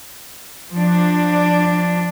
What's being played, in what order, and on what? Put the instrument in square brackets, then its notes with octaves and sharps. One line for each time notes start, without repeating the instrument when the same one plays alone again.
[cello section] F3 D4